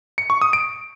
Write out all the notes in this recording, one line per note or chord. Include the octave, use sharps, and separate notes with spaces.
C#7
C#6
D#6
D7